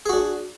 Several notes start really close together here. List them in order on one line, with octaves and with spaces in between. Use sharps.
G#4 F#4 D4